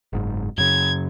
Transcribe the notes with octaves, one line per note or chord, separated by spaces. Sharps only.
F#1 G#2
F#2 C#3 G#6